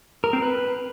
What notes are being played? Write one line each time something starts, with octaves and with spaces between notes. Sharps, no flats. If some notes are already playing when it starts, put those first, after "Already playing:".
A#4
C4
B4